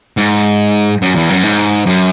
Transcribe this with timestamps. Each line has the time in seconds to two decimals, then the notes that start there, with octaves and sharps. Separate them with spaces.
0.17 G#2
1.02 F#2
1.15 E2
1.30 F#2
1.43 G#2
1.86 F#2